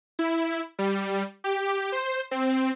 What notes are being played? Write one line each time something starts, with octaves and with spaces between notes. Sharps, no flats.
E4
G3
G4
C5
C4